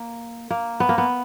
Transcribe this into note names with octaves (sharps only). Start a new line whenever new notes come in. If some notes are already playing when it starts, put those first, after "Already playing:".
Already playing: A#3
A#3
B3
A#3
B3